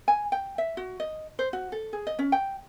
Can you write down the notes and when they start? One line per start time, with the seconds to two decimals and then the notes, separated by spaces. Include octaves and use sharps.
0.08 G#5
0.32 G5
0.58 E5
0.77 F#4
1.00 D#5
1.39 C5
1.53 F#4
1.72 A4
1.93 G#4
2.07 D#5
2.19 C#4
2.32 G5